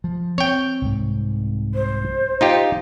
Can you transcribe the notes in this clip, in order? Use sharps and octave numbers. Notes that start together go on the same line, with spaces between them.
F3
C4 C#5 G5
C2 G#2
C5
D#4 F4 G4